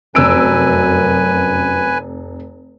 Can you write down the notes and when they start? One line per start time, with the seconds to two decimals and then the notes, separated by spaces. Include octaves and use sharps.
0.15 F1 F#2 B4 G#5 E6 D7